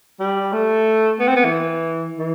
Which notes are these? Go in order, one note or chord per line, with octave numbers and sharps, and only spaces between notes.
G3
A3
B3
C4
B3
E3
E3